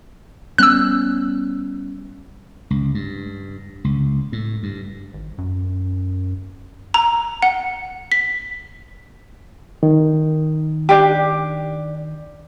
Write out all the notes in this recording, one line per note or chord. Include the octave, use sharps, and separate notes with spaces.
G3 B3 C#4 E6 F#6
C#2
G2
C#2
A2
G2
G#1
F#2
A#5
F#5
B6
D#3
D4 G4